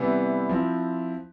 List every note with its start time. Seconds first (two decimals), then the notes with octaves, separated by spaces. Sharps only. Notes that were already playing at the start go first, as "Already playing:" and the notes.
Already playing: C3 E3 G3 B3 E4
0.49 F3 C4 E4